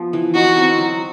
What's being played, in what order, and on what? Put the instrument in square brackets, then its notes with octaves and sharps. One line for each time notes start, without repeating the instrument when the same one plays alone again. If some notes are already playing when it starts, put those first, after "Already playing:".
Already playing: [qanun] F3 B3
E3
[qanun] D#4 [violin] F#4
[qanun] C4
F#3